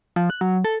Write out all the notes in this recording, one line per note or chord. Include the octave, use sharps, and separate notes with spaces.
F3
F#6
F#3
A4